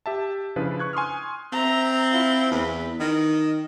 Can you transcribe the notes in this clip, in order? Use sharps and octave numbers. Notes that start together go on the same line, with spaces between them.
G4 E5 A5
C#3 F3 D4 E4 F4 B4
C#6 F#6 G#6
G#5 C6 C#6 D#6 F6
C4 E5 A#5
E4 F4
E2 B4
D#3 D#5